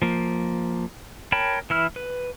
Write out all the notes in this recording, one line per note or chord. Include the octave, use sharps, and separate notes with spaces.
F3 A#3
A#4 C#5 G5 A5 B5
E3 E4 F6
B4